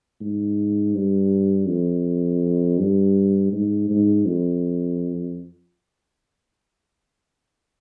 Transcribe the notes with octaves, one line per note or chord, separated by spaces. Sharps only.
G#2
G2
F2
G2
G#2
G#2
F2